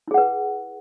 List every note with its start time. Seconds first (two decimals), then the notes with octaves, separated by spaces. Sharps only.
0.08 E4
0.11 G#4
0.14 F#5
0.18 B4